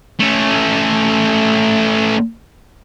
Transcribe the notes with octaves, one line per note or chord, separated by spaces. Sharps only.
A3 C#4